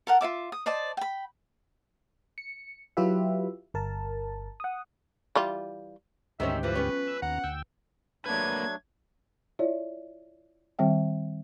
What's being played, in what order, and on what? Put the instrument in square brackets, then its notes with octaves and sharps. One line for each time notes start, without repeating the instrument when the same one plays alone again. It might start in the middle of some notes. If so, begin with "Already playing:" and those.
[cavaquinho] A4 A#4 F#5
F4 C#5 E5 D6
D#6
C5 D5 D#5 A5
G5 B5
[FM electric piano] C#7
F#3 E4 F4 G4 B4 E5
G1 A#4 A5
F#5 D#6
[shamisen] E3 G3 F4
[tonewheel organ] D2 G#2 G4 [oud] D#3 C4 C#4 [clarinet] E5
[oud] E3 F3 [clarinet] B4
[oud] B3 C#4
[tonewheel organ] E6
[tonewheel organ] D#2 A#5 [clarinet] F#5
[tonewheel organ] D2 G5 E6
[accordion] F#3 A3 D4 [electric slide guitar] A#3 B4 [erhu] G#6
[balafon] E4 F4 C#5 D5 E5
D#3 G3 C4 E5 G5